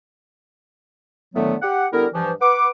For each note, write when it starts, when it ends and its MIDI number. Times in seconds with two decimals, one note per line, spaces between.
1.35 1.55 45
1.35 1.55 50
1.35 1.55 51
1.35 1.55 54
1.35 1.55 57
1.35 1.55 59
1.62 1.86 67
1.62 1.86 78
1.93 2.06 50
1.93 2.06 55
1.93 2.06 59
1.93 2.06 64
1.93 2.06 70
2.14 2.31 43
2.14 2.31 52
2.14 2.31 53
2.41 2.68 71
2.41 2.68 78
2.41 2.68 86